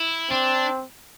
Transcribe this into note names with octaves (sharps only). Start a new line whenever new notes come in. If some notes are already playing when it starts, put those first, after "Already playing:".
Already playing: E4
C4 D4